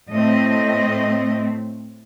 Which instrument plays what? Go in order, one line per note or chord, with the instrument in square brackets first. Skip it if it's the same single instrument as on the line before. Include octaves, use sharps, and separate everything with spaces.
[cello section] A2 A3 C4 D#5